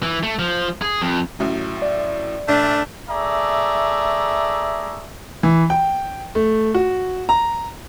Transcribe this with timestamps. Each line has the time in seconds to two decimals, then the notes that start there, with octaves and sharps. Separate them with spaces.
0.03 E3
0.23 A3
0.39 F3
0.82 G#4
1.02 F2
1.39 A1 A2 F#3
1.82 D5
2.48 A#1 A3 D4
3.09 A3 G#4 D5 E5 A#5
5.43 E3
5.70 G5
6.35 A3
6.74 F#4
7.29 A#5